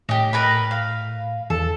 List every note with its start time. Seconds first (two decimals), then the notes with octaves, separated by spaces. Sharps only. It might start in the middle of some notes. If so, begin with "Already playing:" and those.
0.09 A2 D#4 G4
0.33 A#4 B4 B5
0.71 F5
1.50 E2 A4